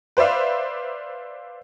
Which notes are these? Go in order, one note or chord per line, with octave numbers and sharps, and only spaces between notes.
B4 C5 D5 E5 F5